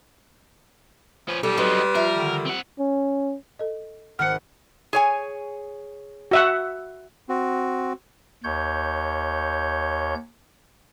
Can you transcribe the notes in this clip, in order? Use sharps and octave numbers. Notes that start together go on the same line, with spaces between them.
F3 C#4 B4
B1 G3 A4
F#3 G#3 B3 C4 D#4 B4 C6
F3 A#4 E5
D3 D#3
C4 F#5
C#4
A4 D#5
G#1 F#5 F6 C#7
G#4 C#5 G#5
F#4 E5 F#5
C4 F#4
D#2 C#5 G6